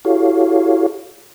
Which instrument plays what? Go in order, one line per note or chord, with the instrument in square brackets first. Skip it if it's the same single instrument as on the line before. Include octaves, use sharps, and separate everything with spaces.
[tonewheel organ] E4 F#4 G4 A4 C#5 F5